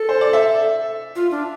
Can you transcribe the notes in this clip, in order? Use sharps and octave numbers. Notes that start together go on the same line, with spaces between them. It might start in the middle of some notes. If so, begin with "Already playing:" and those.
Already playing: A4
C5
D5
E5
F4
D4